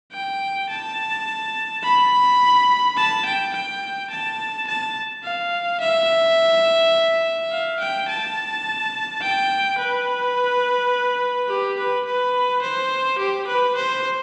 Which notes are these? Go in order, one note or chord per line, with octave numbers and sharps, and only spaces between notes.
G5
A5
B5
A5
G5
G5
A5
A5
F5
E5
F5
G5
A5
G5
B4
G4
B4
B4
C5
G4
B4
C5